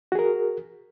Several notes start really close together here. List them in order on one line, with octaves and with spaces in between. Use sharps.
F#4 G#4 A#4